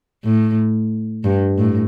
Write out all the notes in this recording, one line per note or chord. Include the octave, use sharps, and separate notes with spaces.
A2
G2
A2